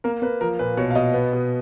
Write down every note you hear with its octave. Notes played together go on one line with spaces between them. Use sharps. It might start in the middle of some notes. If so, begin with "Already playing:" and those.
A#3 A#4
A#3 B4
F3 A#4
A#2 B4
B2 C#5
F5
B2 D#5
B3
B2